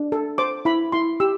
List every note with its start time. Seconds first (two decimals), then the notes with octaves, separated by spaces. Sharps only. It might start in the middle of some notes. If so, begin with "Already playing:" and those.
Already playing: D4
0.12 A4
0.38 C5 D6
0.65 E4 B5
0.92 E4 C6
1.20 G4 E6